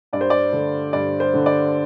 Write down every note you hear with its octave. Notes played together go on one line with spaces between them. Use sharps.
G2 D5
C5
D5
D3 A3
G2 D5
C5
D3 A3
D5